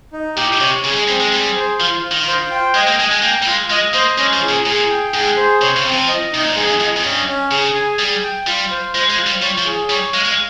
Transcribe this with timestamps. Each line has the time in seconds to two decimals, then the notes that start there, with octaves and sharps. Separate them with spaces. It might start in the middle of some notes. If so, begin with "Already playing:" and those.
0.13 D#4
0.36 A#2 G4
0.60 C3 C#5
0.84 C#3 G#4
0.92 G3
0.96 G#3
1.08 G3 C4
1.20 G#3
1.32 G3 G#4
1.56 C5
1.80 F3 F4
2.04 F4
2.11 D#3
2.27 C5
2.51 G5
2.75 G#3 D#5
2.87 A#3
2.99 G#3 G#5
3.11 G#3
3.22 A#3 G5
3.42 G3
3.47 G#3 F4
3.70 G#3 D#5
3.94 A#3 C5
4.18 G#3 C#4
4.33 F3
4.42 G#4
4.49 A#2
4.66 A#2 G#4
4.90 G5
5.13 G#2 G#4
5.37 C5
5.61 C3 C#5
5.77 C#3
5.85 C4
5.92 F3
6.09 D#5
6.32 C3 D#4
6.41 A#2
6.49 G#2
6.56 G2 G#4
6.68 F2
6.80 F2 D#5
6.97 F2
7.03 G2 C#4
7.28 C#4
7.51 C#3 G#4
7.75 G#5
7.99 G3 G#4
8.23 G5
8.47 G3 F4
8.71 C5
8.94 G#3 C5
9.10 G#3
9.18 F4
9.27 G3
9.42 G3 C#5
9.58 F3
9.66 G#4
9.90 G3 C#5
10.14 G#3 F5
10.25 G#3